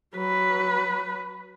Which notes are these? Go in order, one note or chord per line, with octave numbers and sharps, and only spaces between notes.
F#3 B4